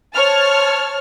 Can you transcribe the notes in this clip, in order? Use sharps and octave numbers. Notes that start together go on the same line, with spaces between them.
C5 C#5 A5 F6